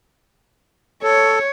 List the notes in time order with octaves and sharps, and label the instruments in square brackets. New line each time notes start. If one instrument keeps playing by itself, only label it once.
[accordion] A4 [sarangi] C#5